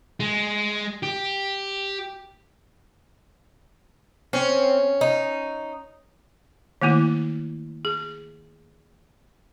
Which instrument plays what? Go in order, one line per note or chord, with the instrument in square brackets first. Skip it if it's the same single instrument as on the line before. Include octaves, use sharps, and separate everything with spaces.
[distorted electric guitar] G#3
G4
[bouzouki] C4 [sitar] C#4
[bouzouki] D#4
[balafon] D#3 A3 A#3 E4
G#4